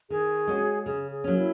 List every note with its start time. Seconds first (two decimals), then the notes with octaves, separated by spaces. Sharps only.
0.10 D#3 G#4
0.48 G#3 C#4 F#4
0.86 C#3 G#4
1.12 G#4
1.24 F#3 A#3 C#4
1.38 E4